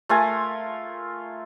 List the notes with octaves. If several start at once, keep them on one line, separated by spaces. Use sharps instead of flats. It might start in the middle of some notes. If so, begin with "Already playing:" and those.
A3 F4 A#4 G#5